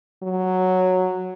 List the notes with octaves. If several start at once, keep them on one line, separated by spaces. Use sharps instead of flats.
F#3